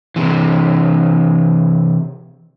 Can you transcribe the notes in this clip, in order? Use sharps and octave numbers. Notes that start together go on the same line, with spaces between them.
C3 E3